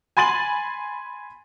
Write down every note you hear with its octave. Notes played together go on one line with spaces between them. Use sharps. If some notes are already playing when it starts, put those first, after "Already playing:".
G#5 B5 C6 A6 D#7 F#7